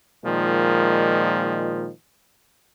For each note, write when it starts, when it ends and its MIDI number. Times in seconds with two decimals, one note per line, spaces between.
0.24 1.89 46
0.24 1.89 51
0.24 1.89 53
0.24 1.89 56